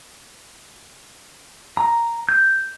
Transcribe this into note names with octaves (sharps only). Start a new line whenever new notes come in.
A#5
G6